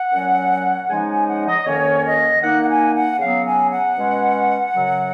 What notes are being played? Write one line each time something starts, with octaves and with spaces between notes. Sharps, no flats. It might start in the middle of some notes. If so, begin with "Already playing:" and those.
Already playing: F#5
A#2 F#3 C#4
C#3 F3 G#3 D#4 G#5
G#5
F#5
D#5
F2 D#3 A#3 C#4 C#5
D#5
D#3 A#3 D#4 F#5
F#5
G#5
F#5
C#3 F#3 B3 F5
G#5
F#5
B2 G#3 C#4
F#2 C#3 F#3